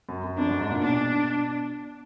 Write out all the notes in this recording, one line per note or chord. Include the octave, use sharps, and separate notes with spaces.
F#2
F#2
F2 D4
F#2
G#2
A#2
B2 D4